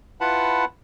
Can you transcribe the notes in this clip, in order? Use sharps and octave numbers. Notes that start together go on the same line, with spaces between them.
E4 F4 B4 F#5 A5 B5